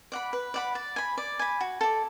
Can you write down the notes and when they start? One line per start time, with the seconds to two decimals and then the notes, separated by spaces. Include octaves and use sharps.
0.12 D5 F#5 B5
0.33 B4
0.54 D5 F#5 B5
0.75 D5
0.96 G#5 B5
1.17 D5
1.39 G#5 B5
1.60 F#4
1.81 A4 D5